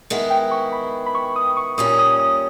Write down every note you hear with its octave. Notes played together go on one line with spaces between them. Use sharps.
D#3 G#3 B3 E4
G5
C#6
B5
B5
C#6
D#6
C#6
A#2 G3 C#4 D#6
D#6
D#6